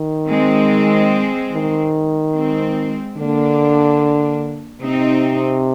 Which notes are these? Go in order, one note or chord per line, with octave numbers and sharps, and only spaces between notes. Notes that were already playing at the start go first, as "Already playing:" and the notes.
Already playing: D#3
G#3 C4
D#3
G#3 C4
D3 A#3 D4
C3 C4 D#4